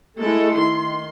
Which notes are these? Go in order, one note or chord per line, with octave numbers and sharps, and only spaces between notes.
G#3 A3 E4 A4
D#3 C6